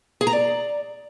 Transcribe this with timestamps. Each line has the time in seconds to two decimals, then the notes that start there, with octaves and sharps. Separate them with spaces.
0.21 G#4
0.27 A#5
0.33 D5